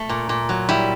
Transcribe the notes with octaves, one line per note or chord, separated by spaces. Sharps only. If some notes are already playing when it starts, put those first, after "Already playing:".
Already playing: A3
A#2
A#2
F#3
G3 E4